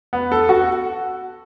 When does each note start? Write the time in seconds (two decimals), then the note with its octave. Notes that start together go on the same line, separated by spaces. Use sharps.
0.13 B3
0.32 A4
0.49 F#4